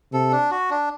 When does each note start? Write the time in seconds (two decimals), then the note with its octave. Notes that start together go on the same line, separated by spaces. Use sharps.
0.13 C3 A4
0.32 D4
0.51 F#4
0.70 D4